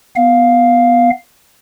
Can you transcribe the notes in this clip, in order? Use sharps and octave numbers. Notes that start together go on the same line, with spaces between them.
B3 F5